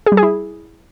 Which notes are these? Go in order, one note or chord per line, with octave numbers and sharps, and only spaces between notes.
G#4
G3
G#4
E4